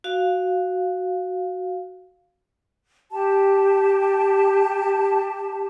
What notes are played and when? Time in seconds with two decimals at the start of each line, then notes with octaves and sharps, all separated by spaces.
0.04 F#4 F5
3.11 G4 A5